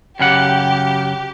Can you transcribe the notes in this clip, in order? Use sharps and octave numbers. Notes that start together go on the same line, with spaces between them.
F#2 C#3 G4 F#5